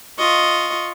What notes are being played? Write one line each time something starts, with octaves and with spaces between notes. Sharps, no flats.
F4 D#5 C#6